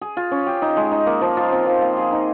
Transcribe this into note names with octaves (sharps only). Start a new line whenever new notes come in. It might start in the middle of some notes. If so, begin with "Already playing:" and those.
G#4
F4
C#4
G4
D#4
G#3
D#4
A#3
F3
F4
C4
F3
A#3
G#4
D#4